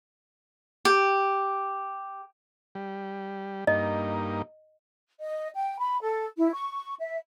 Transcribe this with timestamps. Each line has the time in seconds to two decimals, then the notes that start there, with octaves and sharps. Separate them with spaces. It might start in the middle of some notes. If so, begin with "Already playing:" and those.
0.85 G4
2.75 G3
3.67 G2 A#3 D#4 D#5
5.21 D#5
5.54 G5
5.79 B5
6.02 A4
6.37 E4
6.53 C#6
7.00 E5